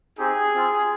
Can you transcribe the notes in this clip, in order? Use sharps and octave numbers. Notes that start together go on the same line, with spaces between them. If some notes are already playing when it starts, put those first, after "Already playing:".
C4 D#4 G4 G#4
C4 F4